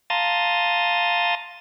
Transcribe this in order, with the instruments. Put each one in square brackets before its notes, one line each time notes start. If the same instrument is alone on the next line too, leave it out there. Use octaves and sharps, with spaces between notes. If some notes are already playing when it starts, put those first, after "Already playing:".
[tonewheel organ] F5 A5 A#5 C6 D#6 A6